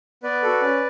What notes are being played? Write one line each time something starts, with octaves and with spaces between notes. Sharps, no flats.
B3 B4 D5
F#4 A4
C#4